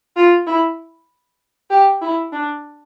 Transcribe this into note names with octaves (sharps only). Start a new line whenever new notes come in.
F4
E4
G4
E4
D4